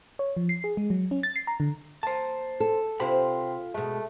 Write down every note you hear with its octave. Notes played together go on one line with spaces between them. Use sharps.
C#5
F3
C7
G#4
G#3
F#3
C#4
A6
C7
A#5
D3
A#3 C5 A5
A4
C3 C4 F4 G4 C5 B5
B2 G#3 A3